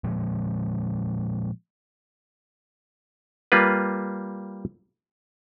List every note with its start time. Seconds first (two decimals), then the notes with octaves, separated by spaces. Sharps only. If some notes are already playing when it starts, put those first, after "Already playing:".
0.04 A#2 F3 G#3
3.52 G3 A#3 F4 B4